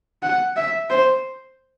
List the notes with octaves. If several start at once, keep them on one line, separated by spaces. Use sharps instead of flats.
F#5
E5
C5